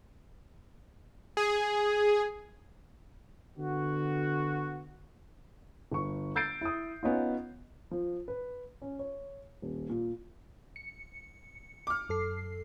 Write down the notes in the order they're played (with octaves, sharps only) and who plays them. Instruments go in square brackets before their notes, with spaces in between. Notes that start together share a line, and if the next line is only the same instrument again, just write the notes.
[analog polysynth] G#4
[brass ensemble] D3 B3 F#4
[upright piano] G1 C#6
E6 G6 A6 C7 D7
E4 D#6
B3 C#4 D#4 F4
F3
B4
C#4
C#5
D#1
A#2
[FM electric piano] C#7
[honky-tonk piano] D6 F6
[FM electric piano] F#2 A4 C7